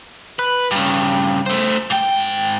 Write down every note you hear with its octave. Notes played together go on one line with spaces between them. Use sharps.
B4
G2 C#3
A3 C5
G#2 G5